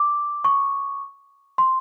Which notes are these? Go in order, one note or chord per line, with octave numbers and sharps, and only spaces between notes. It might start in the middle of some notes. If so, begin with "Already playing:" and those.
Already playing: D6
C#6
C6